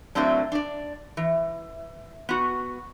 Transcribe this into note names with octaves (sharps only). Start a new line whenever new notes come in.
A2 F#3 A3 A#3 C4 D4
D4 D5
E3
B3 F#4